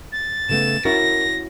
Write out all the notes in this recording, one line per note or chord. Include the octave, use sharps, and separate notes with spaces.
A6
C#3 A3 B3 E7
C#4 E4 F#4 A#4 A#6